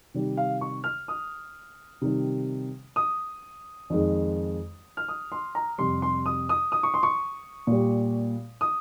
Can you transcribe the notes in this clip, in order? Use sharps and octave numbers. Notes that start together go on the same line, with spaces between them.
C3 D#3 G3
F5
C#6
F6
D#6
C3 D#3 G3
D#6
F2 D#3 G#3
F6
D#6
C6
A#5
F2 C3 G3 C6
C6
D#6
D#6
D#6
C#6
C6
C#6
A#2 G3
D#6